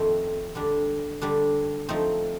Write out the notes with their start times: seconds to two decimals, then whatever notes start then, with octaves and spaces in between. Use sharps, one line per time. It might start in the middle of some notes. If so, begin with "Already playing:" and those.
Already playing: F2 D#3 A3 C4
0.55 D3 G3 D4
1.22 D3 G3 D4
1.89 F3 A3 C4 D#4